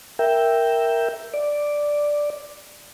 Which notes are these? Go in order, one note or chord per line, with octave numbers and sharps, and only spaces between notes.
A#4 E5 G5
D5